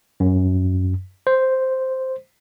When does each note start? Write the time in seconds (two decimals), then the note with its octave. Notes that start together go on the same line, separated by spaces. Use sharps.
0.20 F#2
1.27 C5